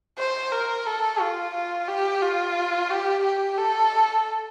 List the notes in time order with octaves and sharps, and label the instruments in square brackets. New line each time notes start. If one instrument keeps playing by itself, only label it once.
[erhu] C5
A#4
A4
F4
F4
G4
F4
G4
G4
A4